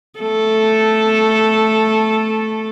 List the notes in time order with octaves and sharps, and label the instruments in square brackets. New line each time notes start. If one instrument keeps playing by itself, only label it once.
[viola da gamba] A3 A4